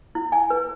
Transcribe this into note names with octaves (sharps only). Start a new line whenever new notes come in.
E4
G#5
B4